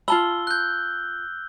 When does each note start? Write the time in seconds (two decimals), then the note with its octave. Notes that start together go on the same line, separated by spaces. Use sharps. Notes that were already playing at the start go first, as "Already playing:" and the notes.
0.08 F4 A5 B5 E6 G7
0.47 F#6 G6